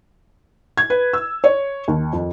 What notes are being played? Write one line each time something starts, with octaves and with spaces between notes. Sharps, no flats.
G#6
B4
E6
C#5
D#2
F2